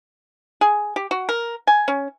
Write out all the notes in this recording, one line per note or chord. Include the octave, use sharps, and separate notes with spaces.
G#4
G4
F#4
A#4
G#5
C#4